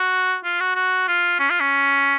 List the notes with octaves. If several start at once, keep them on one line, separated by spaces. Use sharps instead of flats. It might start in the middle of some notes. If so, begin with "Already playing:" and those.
Already playing: F#4
F4
F#4
F#4
F4
C#4
F4
C#4